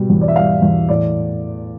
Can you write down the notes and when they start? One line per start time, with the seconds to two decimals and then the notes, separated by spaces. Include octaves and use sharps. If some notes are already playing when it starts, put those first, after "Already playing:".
Already playing: B2 G3
0.10 E2
0.21 D5
0.28 E5
0.36 G3 F5
0.62 E2
0.89 A2 D5